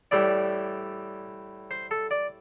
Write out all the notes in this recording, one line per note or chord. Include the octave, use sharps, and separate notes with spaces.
A2 E3 G3 D5
C5
A4
D5